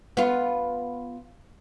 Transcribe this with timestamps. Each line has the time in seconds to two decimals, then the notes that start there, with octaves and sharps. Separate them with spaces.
0.17 B3 F4